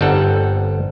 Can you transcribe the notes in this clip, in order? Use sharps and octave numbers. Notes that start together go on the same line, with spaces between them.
G1 G3 C4 D#4 A4 F#5